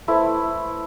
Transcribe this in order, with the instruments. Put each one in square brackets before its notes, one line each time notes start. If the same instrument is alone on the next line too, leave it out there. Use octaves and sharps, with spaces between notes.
[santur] A3 E4 B4 C5